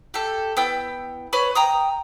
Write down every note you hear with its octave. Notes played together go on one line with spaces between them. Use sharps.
G4 A4
B3 E4 G5 E6
B4 C#5 B5
G5 A#5 D#6